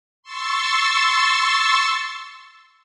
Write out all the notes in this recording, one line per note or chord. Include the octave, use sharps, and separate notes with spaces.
C6 C#6 E6 A6